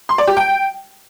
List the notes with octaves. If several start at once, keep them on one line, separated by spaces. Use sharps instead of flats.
C6
D5
G4
G5